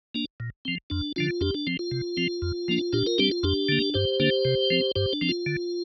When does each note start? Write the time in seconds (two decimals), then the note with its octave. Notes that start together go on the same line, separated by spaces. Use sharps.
0.15 A#3 D4
0.40 A#2
0.65 F3 C4
0.90 F2 D4
1.16 D3 F3 D4 F4
1.41 F2 D4 G4
1.54 D4
1.67 F3 C4
1.79 F4
1.91 C3
2.17 F3 C4
2.42 F2
2.68 F3 A#3 D4
2.93 A#2 D4 G4
3.06 F4 A#4
3.18 G3 C4 D4 G4
3.31 F4
3.43 F2 D4 G4
3.69 D3 A#3
3.94 G2 G4 C5
4.20 D3 A#3 D4
4.45 C3
4.70 F3 C4
4.95 G2 G4 C5
5.13 D4
5.21 F3 C4
5.29 F4
5.46 D3